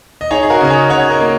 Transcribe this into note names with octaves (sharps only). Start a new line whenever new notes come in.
D#5
D#4 G#4 C#5
G#4
F#4 A#4
C#3 D#5
G#4 C#5
C#3 C#5 F#5
A#4 D#5
A#3